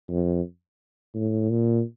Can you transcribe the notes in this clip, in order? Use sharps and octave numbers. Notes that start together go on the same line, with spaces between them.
F2
A2
A#2